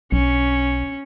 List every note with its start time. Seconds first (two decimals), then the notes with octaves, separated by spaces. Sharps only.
0.12 B1 C#4